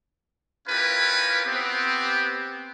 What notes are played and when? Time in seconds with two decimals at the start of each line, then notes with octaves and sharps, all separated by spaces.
0.68 C#4 E4 F4 G4 A#4 B4
1.45 B3 C4 G4